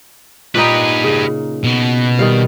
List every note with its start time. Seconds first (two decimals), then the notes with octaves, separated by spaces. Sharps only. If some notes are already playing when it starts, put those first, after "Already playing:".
0.55 A#2 D#4 G4 B4
1.04 C#3
1.64 B2
2.19 D#3 G3 F5